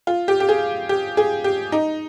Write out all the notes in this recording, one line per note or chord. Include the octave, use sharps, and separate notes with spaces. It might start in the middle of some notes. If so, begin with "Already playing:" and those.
F4
G4
G4
G#4
G4
G#4
G4
D#4